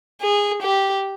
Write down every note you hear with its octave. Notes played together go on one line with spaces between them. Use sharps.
G#4
G4